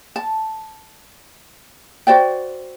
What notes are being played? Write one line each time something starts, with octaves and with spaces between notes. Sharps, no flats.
A5
F#4 C5 D5 G5